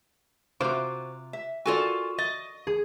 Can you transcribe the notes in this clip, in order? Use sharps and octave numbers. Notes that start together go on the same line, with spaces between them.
C3 F4 F#4 C5 D6
E5
F4 F#4 A4 A#4 D5 G#5
D#5 A6
G#4